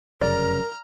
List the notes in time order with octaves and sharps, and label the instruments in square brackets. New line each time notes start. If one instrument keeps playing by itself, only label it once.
[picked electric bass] F1 F#2 C#3 [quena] A#4 [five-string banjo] D5 [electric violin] A#5 F6